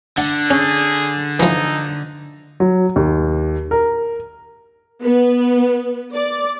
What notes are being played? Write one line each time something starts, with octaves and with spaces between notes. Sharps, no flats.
D3 F#5
C#4 G#4
E3 F3 D#4
F#3
D#2
A#4
B3
D5